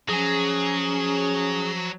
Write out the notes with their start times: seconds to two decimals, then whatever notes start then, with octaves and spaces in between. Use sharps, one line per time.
0.09 F3 F#3 C#4 G#4 G#5